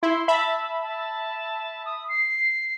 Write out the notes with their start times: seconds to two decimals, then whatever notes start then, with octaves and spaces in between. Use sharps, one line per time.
0.03 E4 C6
0.28 E5 A5 B5
0.81 A5
1.86 D#6
2.09 C7